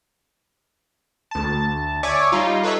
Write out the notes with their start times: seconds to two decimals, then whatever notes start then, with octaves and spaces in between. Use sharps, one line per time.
1.31 D2 A5
2.03 C#5 D5 E5 G#5 C#6 D6
2.32 G3 D#4 F4
2.63 A4 B4 C#5 D#5 E5